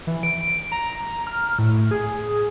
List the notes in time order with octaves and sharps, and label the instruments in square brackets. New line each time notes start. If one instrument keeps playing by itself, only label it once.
[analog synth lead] E3
D7
A#5
F6
A2
G#4